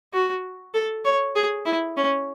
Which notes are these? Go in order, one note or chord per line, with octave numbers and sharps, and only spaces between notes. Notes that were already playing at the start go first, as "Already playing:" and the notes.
F#4
A4
C#5
G#4
E4
C#4